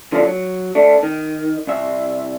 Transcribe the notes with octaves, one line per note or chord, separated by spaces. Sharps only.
D3 F3 A3 A#3 C4 D4
F#3
A3 D4
D#3
C2 E5